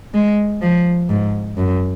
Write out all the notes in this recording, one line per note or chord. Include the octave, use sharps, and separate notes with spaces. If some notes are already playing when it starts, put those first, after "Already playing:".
G#3
F3
G#2
F#2